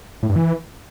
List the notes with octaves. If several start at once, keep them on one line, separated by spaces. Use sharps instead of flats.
A2
G2
E3